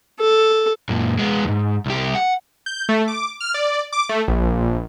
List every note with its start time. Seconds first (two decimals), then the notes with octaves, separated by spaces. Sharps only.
0.20 A4
0.89 F#2 A#2
1.19 G#3 B3
1.44 E2 G#2
1.86 C2 G4
2.15 F#5
2.66 G6
2.89 A3
3.08 D6
3.40 F6
3.54 D5
3.93 D6
4.09 A3
4.28 A#1